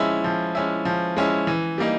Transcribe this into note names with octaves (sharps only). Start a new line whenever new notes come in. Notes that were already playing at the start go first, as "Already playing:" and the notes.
Already playing: F3 G#3 C#4 E4
F3
G#3 C#4 E4
F3
G#3 C#4 E4
E3
G3 A#3 D#4